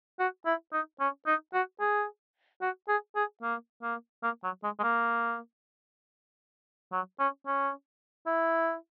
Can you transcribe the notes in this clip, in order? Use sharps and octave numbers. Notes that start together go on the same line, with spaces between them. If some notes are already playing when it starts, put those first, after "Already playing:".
F#4
E4
D#4
C#4
D#4
F#4
G#4
F#4
G#4
G#4
A#3
A#3
A#3
F#3
G#3
G#3
A#3
F#3
C#4
C#4
E4